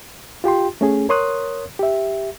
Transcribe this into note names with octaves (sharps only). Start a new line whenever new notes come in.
F4 G4 G5 C6
A3 C#4 G#4
A#4 C#5 C6 D#6 F#6
G4 E5